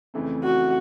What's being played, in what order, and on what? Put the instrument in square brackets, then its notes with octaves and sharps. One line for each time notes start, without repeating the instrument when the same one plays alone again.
[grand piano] F2 C#3 E3 A3 C4
[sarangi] F#4